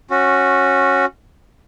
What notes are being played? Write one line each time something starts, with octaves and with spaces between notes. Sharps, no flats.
C#4 F#4